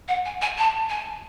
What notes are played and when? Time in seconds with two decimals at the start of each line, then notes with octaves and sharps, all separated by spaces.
0.08 F#5
0.25 G#5
0.42 G#5
0.58 A5
0.90 G#5